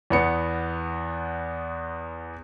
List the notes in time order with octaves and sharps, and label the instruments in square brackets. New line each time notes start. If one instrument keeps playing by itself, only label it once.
[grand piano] E2 B3 C#7